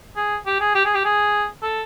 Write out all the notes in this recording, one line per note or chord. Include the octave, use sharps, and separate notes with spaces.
G#4
G4
G#4
G4
G#4
G4
G#4
A4